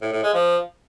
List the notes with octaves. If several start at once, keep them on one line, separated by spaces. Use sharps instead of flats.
A2
A2
G#3
F3